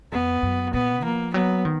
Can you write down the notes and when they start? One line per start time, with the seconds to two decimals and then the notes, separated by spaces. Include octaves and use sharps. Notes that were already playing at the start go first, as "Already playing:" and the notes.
0.13 F2 B3
0.42 F#2
0.73 A#2 B3
1.04 F3 A#3
1.34 F#3 B3
1.65 D#3